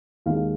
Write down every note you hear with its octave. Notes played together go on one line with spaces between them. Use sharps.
D#2 D#3 G#3 F5